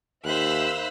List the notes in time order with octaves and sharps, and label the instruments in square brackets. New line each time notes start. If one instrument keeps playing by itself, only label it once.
[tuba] D#2 [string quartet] C5 F5 F#6 [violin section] E5 B5 E6